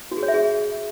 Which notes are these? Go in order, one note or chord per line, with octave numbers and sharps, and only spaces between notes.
F#4
G#4
C#5
E5
G#4